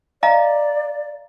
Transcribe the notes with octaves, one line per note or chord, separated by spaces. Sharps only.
D5 D#5 F5 A#5